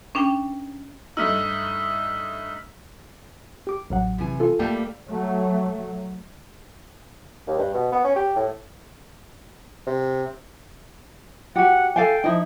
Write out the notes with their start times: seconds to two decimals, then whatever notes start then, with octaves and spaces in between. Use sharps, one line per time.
0.15 C#4 D4 G5
1.17 G2 A3 D#4 E6 F6 B6
3.67 G4 D6
3.90 A1 F#3 F#5
4.18 C3 E3 G#5
4.40 F4 A4
4.59 G3 A3 A#3 G5 A5 G6
5.07 F#3 A3
7.47 D#2
7.59 G2
7.74 B2
7.92 B3
8.04 C#4
8.16 G4
8.36 A2
9.86 C3
11.56 F#4 G4 F#5
11.96 A4 F5 G5 G#5
12.24 F3 D#4 E4